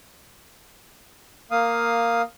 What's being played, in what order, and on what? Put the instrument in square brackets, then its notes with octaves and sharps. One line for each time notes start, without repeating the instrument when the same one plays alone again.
[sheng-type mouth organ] A#3 F5 D#6